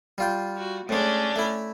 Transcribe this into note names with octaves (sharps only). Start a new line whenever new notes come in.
G3 F4 G5
F#4
A2 G#3 C#4 D4
A3 E4